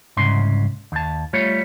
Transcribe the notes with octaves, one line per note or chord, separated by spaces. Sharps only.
C2 G#2 C#3 C6
D#2 A5
G3 A3 F4 C#5